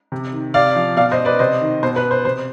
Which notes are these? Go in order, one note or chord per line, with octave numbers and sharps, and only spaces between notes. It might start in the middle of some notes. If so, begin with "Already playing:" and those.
C3
D#3
C3 D5 F5
F3
B2 D5 F5
C5 D#5
B4 D5
C3 C5 D#5
D#3
B2 C5
B4
C5
C3 C5